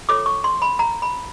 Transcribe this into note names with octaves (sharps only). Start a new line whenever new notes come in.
F4 A4 C#5 D6
C#6
C6
B5
A#5
B5